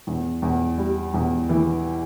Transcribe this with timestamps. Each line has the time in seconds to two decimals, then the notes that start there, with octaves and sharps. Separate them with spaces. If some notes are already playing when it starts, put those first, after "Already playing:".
0.07 E2
0.42 E2
0.77 G3
1.14 E2
1.49 E3